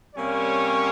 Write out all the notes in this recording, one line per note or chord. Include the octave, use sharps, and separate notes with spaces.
C3 G3 A#3 C#4 C#5